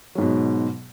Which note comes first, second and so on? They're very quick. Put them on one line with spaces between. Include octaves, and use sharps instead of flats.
F#3 G#2 B2